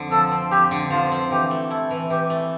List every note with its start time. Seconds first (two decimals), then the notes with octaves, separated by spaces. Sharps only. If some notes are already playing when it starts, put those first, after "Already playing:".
Already playing: F2 D3
0.11 F3 A4
0.31 C4
0.51 F2 G4
0.71 D3
0.90 F3 F4
1.11 C4
1.31 E3 G4
1.51 A3
1.71 E4 A4
1.91 E3
2.10 E3 G4
2.30 A3